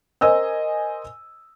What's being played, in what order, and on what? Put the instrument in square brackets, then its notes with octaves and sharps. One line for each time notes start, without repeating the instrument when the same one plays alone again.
[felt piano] A#4 C5 D#5 G#5 E6